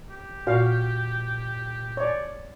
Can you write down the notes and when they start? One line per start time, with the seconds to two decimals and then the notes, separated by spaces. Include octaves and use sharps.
0.10 G4
0.47 A#2 F#4 F5
1.97 C#5 D5